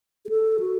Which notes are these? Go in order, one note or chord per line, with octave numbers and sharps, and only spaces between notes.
G#4
A4
F#4